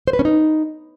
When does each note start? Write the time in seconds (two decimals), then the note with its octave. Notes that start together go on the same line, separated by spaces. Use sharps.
0.07 C5
0.13 B4
0.19 C#4
0.25 D#4